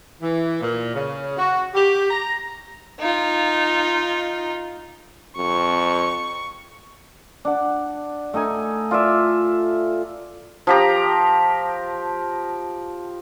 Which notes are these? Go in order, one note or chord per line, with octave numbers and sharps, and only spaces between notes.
E3
A#2
C#3
F#4
G4
A#5
D#4 F4
F2 C#6
D4 F#5
A3 D#4 A4 G#5
F4 D5 E5
F3 G4 A#5